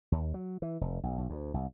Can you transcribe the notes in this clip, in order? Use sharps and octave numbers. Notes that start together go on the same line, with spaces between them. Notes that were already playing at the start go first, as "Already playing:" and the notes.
D#2
F#3
E3
F1
B1
B1
D2
C2